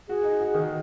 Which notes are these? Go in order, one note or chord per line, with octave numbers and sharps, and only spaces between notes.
F#4 G#4
D#4
F#4
D#3